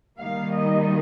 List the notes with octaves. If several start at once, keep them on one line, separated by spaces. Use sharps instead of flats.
D#3 G3 A#3 D#4 F5
D#5